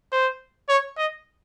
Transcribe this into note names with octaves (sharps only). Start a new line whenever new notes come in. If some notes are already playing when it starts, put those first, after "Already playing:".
C5
C#5
D#5